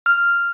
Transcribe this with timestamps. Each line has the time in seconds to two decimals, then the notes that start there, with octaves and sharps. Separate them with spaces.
0.06 F6